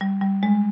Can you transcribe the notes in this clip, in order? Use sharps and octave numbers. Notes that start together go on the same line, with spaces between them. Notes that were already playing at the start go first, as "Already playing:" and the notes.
G3
G3
G#3